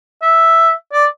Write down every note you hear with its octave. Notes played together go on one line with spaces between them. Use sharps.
E5
D5